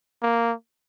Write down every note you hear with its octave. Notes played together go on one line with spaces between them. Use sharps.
A#3